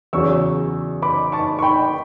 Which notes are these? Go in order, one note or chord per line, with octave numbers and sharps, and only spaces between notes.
E2 C#3 F#3 C#6 E6
B5 D6
A5 C#6
C#6
G5 B5